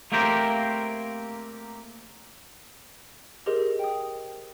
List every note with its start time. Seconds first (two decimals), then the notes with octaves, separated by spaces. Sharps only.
0.12 A3 A#3 C4 G4 A#4 C5
3.46 G4 G#4 A#4 C5 D#5 C6
3.79 G5 D#6